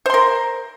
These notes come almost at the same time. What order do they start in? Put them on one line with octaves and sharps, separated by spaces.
C5 C6 A#4